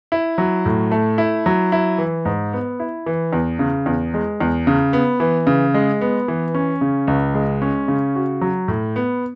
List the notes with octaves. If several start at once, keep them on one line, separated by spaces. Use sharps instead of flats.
E4
F#3
A2
A3
E4
F#3
E4
E3
G#2
B3
E4
E3
E2
C#3
E2
G#3
E2
C#3
B3
E3
C#3
G#3
B3
E3
C#4
C#3
C#2
G#3
C#4
C#3
F#4
F#3
A2
B3